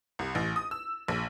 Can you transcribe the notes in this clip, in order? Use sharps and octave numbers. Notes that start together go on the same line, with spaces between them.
C2
A1
D#6
E6
A#1